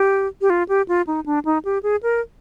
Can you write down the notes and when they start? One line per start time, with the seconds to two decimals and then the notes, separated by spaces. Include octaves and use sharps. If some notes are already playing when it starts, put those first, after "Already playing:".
Already playing: G4
0.41 G4
0.50 F4
0.69 G4
0.88 F4
1.07 D#4
1.26 D4
1.45 D#4
1.65 G4
1.83 G#4
2.03 A#4